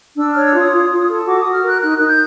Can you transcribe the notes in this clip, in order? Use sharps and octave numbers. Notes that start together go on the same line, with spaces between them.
D4 E6
F6
C#5
E6
F4
D#6
F4
F4
A4
F#4 D6
F#4 D#6
F6
A#4 F#6
D#4 F#6
D#4 F#6
G6